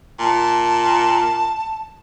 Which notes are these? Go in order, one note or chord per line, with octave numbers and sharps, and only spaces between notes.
A#2 A5